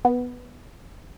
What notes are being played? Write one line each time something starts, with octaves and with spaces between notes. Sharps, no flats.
B3